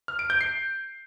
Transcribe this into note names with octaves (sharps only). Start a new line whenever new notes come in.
F6
D7
G6
C7